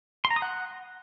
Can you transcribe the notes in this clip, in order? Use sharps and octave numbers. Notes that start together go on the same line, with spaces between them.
C6
A#5
D#6
F#5